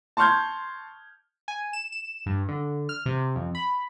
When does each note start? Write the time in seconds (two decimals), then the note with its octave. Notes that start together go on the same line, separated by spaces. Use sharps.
0.17 A5 C6 C#6 F6 G6 G#6
1.48 G#5
1.73 E7
1.92 E7
2.26 G2
2.49 D3
2.89 F6
3.06 C3
3.36 F2
3.55 B5